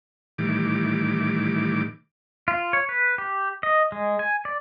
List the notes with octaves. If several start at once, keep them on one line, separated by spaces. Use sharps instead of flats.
A2 D#3 E3 G3 D6
F4
C#5
B4
G4
D#5
G#3
G#5
D5